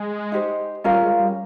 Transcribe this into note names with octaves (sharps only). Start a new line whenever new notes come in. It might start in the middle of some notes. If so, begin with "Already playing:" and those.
Already playing: G#3
D#4 G4 C5
G3 C#4 F4 A#4 F5
G#3
G3